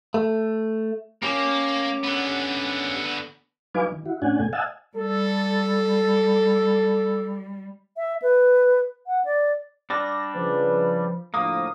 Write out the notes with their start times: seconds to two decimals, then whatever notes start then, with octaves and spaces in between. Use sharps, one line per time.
0.14 A3
1.22 A#3 C#4 G4 A#4
2.04 D3 B3
3.75 F#3 D#4 B4 F5 G#5 D6
3.92 D#3
4.06 E4 F#4
4.22 A2 C#4 D4 F#5 G#5
4.39 B2 A3 G#5
4.53 D#5 F5 F#5 G#5 A5 E6
4.97 G3 A4
7.97 E5
8.22 B4
9.07 F#5
9.25 D5
9.90 G3 D4 A#6
10.35 C#3 F3 B4
11.34 A2 D3 F3 A#3 D#6